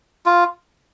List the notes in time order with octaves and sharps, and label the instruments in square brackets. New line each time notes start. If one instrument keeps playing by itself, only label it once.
[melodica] F4